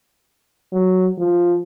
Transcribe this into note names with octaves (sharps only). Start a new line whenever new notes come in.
F#3
F3